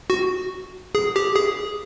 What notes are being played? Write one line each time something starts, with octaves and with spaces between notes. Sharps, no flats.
F#4
G#4
G4
G#4